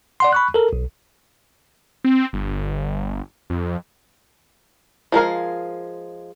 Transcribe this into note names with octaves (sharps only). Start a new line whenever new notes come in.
D5 F#5 C6
B5 C#6 F#6
A4 A#4
B1
C4
G1
F2
F3 G#3 A#4 F5